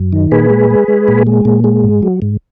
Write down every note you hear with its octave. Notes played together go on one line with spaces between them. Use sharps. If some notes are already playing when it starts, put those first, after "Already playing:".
Already playing: F#2
D#3
A#2 G#4 B4
G#3
G#3
G#3
A#2
G#3
A#2
G#3
G#2
F#3
G#2